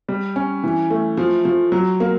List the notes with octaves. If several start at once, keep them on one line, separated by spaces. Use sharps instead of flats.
G3
C#4
E3
A3
F3
F3
F#3
A#3